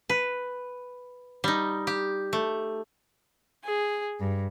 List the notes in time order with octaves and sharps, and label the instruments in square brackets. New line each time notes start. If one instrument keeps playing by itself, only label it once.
[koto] B4
G3 D#4
G4
A3
[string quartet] G#4
G2